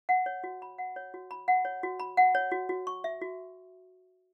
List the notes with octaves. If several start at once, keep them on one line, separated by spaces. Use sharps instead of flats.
F#5
C#5
F#4
B5
F#5
C#5
F#4
B5
F#5
C#5
F#4
B5
F#5
C#5
F#4
F#4
C#6
E5
F#4